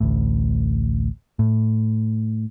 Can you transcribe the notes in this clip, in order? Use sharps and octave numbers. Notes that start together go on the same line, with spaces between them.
A1 D2 A2
A2